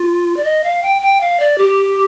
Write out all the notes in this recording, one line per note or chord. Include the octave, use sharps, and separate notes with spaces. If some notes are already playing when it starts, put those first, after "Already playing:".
Already playing: F4
D5
D#5
F5
G5
G5
F5
D5
G4